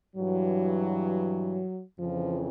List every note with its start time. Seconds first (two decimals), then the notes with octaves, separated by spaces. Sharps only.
0.16 G2 E3 F#3
1.98 F2 C#3 E3 F3